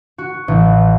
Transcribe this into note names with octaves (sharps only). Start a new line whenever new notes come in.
F#4
A1